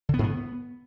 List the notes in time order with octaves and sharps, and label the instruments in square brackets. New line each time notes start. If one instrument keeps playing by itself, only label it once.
[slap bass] D3
B3
G#2
B3